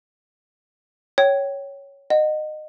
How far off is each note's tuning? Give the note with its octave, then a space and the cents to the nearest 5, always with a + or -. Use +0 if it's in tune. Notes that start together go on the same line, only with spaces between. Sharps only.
C#5 +5 G5 -20
D#5 -20 F#5 +0